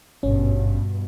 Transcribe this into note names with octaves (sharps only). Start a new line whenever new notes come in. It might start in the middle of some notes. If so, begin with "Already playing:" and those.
G#1 G2 B2 C#4